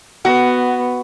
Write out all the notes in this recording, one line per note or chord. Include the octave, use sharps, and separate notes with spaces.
B3 F#4